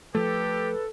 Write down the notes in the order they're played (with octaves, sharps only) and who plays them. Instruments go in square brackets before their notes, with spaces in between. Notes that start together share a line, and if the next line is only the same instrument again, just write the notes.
[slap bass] F3 A3 [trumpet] G4 [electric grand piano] A4 [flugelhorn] B4